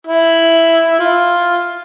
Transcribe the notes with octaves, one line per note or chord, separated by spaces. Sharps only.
E4
F4